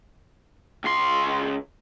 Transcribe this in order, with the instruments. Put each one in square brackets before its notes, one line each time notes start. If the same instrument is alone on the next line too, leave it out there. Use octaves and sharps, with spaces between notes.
[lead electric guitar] C#2 C6